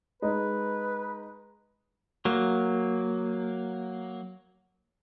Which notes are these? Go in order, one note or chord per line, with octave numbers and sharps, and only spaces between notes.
G#3 D#4 B4
F#3 A#3